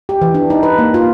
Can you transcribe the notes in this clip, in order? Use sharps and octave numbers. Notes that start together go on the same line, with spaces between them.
G4
E3
D4
D#4
B4
A#3
F4